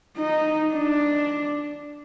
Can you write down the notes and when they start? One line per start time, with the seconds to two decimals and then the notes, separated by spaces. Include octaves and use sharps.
0.17 D#4
0.73 D4